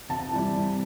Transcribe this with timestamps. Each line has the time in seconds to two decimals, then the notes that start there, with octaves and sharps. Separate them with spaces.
0.09 C3 A5
0.31 E3 G3
0.53 C3